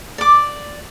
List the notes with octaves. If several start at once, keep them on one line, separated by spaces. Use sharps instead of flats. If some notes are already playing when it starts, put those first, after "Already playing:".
D5 D6